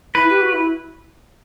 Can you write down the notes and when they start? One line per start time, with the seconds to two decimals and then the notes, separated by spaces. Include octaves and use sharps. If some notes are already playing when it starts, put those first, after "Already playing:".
0.15 E4 B4
0.29 G4
0.41 F#4
0.53 E4